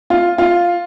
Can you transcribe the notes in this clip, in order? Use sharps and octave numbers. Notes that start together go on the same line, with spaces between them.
F4
F4